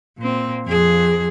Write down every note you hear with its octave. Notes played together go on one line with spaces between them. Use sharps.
A#2 C4
F2 G#4